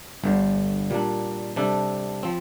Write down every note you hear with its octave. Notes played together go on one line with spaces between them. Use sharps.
G1 G2 D3
A#2 G3 A#3 D4
C3 G3 D4 A4
F3 C4